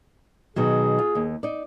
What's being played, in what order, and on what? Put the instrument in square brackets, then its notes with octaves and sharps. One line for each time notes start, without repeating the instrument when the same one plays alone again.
[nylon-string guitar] B2 D#3 F#3 [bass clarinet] G#4
[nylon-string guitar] F4
D#2
D#4 D5